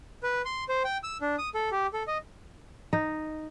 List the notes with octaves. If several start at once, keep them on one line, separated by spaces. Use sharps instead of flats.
B4
C6
C5
G5
E6
D4
D#6
A4
G4
A4
D#5
D#4